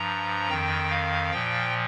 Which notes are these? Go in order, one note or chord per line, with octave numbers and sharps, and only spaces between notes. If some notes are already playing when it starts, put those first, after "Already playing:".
Already playing: G2 F3 A#5
F2 D#3 G5
F5
A#2 F3 G5